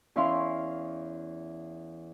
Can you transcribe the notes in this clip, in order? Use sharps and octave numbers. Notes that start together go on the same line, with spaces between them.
E2 C#4 E4 F5 C6